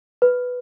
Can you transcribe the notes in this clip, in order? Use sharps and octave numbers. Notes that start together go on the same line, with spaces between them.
B4